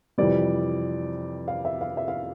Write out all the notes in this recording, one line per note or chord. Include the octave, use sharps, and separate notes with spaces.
F2 C3 E3 G3 D5
F5
E5
F5
E5
F5